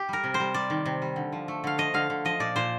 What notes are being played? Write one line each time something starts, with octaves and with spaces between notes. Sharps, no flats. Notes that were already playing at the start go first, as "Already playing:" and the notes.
Already playing: G4
G3 A#4
C3
C5
G3
G3 D5
D#3
C3
G3
D3
F3
A3
D3 F5
F3 D#5
D3 F5
D3
F3 D#5
A#2 D5
A#2 C5